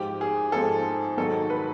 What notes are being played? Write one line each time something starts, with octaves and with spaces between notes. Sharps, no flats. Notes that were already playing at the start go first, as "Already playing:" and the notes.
Already playing: G#2 F3 G4
G#4
G#2 F3 A4
G#2 D#3 F#3 A4
B4